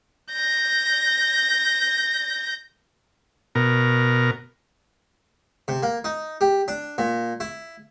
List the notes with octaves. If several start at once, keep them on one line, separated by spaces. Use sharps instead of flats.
G6 A#6
B2 A#4
C3
A#3
D#4
G4
D4
A#2
E4